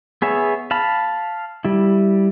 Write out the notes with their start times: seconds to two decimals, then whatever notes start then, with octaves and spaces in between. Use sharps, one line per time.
0.22 B3 G#4 C#5 E5
0.71 F5 A5 B5
1.65 G3 E4